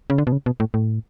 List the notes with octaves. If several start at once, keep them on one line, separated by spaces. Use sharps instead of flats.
C#3
D3
B2
C#3
B2
A2
A2